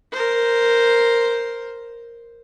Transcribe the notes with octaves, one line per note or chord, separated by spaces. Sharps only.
A#4 C5